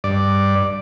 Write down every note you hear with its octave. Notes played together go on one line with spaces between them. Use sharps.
G2 D5